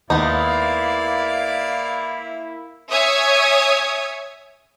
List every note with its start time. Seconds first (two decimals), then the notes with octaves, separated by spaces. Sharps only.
0.10 D#2 G#3 A#3 B3 D#4 E4 D5 F5
2.91 C#5 E5 G#5 D#6 G#6